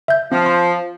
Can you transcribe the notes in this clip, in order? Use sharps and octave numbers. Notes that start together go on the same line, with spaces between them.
E5 G6
F3 C4
C6